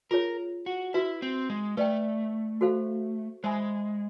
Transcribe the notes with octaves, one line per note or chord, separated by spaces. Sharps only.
F4 G#4 A#4 C#5
F#4
E4 F#4 B4 E5
C4
G#3
A3 B4 D5 G5
F#4 A4 C5 F5
G#3 C5 E5 G#5 B5